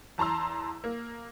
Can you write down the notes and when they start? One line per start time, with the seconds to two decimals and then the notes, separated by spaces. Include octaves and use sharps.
0.18 E2 A5 A#5 C6 E6
0.84 A#3